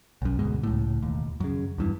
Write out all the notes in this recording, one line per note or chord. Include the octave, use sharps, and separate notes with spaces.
B1 F#2
D2 G#2 B2 G#3
C#2 A2
E1 D#2
F#2 C#3
E2 G2 E3